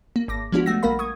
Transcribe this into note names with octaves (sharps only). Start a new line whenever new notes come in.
A#3
G#1 D6 A#6
F3 G#3 B3 D4 F4 F#4
G3 A3 F#5 E6 A#6
A#1 A#3 A#4 F5 B5
C#6 D#6 G#6